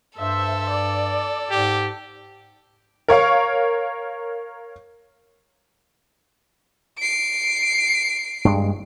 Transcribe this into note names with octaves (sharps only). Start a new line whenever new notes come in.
G2 A4 C5 E5
D5
G#2 G4
A#4 C#5 F5 C#6
C7 D7
G2 G#3